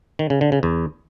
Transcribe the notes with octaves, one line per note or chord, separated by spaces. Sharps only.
D#3
C#3
D3
C#3
E2